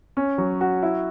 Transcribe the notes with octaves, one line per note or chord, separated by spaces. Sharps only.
C#4
F#3
F#4
E4